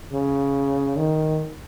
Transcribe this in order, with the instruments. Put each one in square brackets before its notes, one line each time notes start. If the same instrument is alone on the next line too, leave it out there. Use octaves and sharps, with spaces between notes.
[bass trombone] C#3
D#3